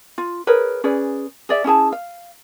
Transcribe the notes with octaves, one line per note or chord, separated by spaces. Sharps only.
F4
G#4 A#4 B4 C#5
C#4 G#4 B4 D5
G#4 D5 E5
C#4 E4 G#4 A5
F5